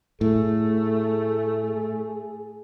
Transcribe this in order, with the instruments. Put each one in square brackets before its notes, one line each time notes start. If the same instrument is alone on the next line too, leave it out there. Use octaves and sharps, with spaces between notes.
[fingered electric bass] A2 [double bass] A3 [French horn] G#4